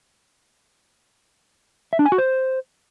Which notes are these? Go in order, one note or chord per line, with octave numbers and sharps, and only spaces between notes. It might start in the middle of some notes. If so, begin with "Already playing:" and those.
E5
D4
G#5
F#4
C5